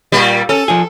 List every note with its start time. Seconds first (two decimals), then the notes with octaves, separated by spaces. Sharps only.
0.12 A#2 G3
0.49 C#4 A4
0.68 F3 G#4